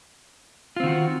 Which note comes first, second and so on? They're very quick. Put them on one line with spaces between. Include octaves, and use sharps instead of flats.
F4 C4 D#3 F#4